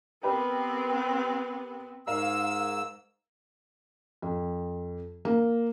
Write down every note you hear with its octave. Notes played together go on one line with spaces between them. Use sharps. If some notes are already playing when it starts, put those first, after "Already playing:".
B3 C4 G4 A#4 B4
G#2 A#4 F5 E6
F2
A#3